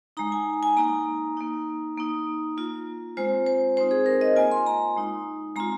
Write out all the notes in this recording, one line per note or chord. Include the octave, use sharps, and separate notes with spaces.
G#3 D#4 A#5
G#5
G#5
A#3 D#4 A#5
A#3 D#4
A#3 D#4
A#3 F4
G#3 C4 F4 C5
C5
G#3 C4 D#4 C5
G#4
A#4
D#5
A#3 F4 G#5
C6
A#5
G#3 D#4
G#3 C4 F4 A#5